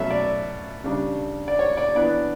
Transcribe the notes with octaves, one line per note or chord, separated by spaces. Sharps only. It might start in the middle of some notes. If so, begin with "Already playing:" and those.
Already playing: B2 F#3 A3 C#4 E5
D5
C#3 G3 D4
D5
C#5
D5
E3 B3 D4 D5